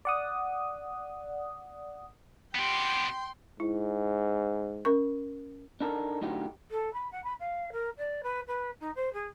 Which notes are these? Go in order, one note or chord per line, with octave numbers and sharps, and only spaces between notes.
D5 F#5 D#6
B3 G4 G5 C6
G#2 E4
C#4 A#4 C#6
D4 D#4 A4 A#4
B1 A2 D3 D#4 F#4 G4
A4
B5
F#5
B5
F5
A#4
D5
B4
B4
D#4
C5
G#4